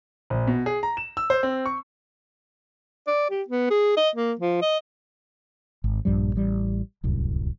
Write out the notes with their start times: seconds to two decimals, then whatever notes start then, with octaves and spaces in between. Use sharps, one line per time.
0.30 A#1
0.47 B2
0.66 G#4
0.83 A#5
0.97 E7
1.17 E6
1.30 C5
1.43 C4
1.66 C#6
3.07 D5
3.30 G4
3.49 B3
3.70 G#4
3.97 D#5
4.16 A#3
4.39 F3
4.62 D#5
5.84 G#1
6.05 A#1 G2 F3 G3
6.36 A1 G3
7.04 D1 C2 F#2